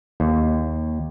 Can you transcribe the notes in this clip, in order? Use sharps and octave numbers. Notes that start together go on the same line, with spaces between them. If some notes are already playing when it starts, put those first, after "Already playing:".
D#2